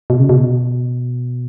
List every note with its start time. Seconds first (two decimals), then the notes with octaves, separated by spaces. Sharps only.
0.10 B2
0.20 C#3
0.29 B2